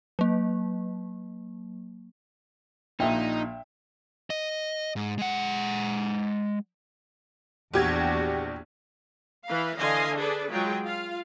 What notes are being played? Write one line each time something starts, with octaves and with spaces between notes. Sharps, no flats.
F#3 A#3
A#1 A#2 D#4 E5 G5
D#5
G#2
G#3 F#5
A#1 E2 D4 F#4 G4 G#6
E3 B4 F5
D3 E3 D#5 F5 G#5 C6
D4 G#4 A4 B4 D5
F#3 G#3 F4 G#4 G5
F4 F5